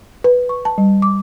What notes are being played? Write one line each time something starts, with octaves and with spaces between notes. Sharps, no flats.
B4
C#6
A5
G3
D6